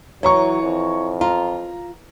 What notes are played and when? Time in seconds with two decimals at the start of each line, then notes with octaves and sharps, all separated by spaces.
0.23 E3 F#3 C#5 A#5 C#6
0.63 F2
1.21 F4 A#5